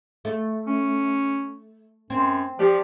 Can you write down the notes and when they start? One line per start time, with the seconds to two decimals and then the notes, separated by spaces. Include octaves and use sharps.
0.25 A3
0.67 C#4
2.10 F#2 C4
2.59 F3 G4 D5